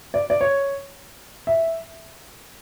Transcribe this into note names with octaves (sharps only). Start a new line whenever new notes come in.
D5
D5
C#5
E5